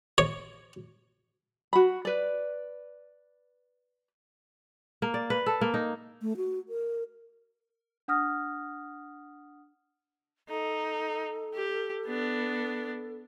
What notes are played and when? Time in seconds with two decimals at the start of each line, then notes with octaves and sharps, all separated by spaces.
0.18 C#5
1.73 F#4 B5
2.05 B4 D5
5.02 A#3
5.14 D5
5.30 B4
5.46 A4
5.61 A#3
5.74 D#4
6.22 A3
6.37 F#4
6.69 A#4
8.08 D4 F#5 D#6 F6 A#6
10.49 D#4 A4
11.54 G4
12.06 B3 D4